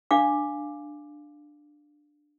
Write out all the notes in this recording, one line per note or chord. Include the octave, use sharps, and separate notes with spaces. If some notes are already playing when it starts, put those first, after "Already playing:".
D4 F5 D6